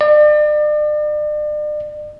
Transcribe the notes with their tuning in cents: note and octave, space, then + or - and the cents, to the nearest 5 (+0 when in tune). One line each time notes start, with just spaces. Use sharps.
D5 +40